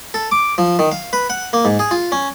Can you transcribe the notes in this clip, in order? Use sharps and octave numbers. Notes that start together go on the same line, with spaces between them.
A4
D6
F3
D#3
F5
B4
F#5
A#3
G#2
G#4
F4
C#4